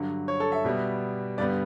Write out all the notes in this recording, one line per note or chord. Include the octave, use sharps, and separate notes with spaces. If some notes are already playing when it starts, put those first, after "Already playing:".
Already playing: G2 D3 F#3
C#5
A4
E5
B2 G3 B3
G2 D3 G3 B3 D5